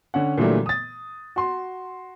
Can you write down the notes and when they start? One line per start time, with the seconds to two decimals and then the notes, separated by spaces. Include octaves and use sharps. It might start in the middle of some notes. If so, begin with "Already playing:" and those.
0.14 D3 C#4 F#5
0.38 A#2 D3 E3 F#3 G3 A3
0.66 D#6 A6
1.36 F#4 C6